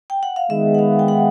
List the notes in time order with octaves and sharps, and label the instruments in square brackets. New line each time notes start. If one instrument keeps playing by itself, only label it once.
[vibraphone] G5
F#5
F5
[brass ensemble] D#3 G#3 B3 [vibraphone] E5
[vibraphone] F#5
F5
G5
F#5